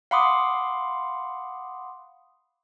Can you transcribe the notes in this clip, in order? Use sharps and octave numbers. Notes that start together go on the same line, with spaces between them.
F5 F#5 B5 C6 D6 D#6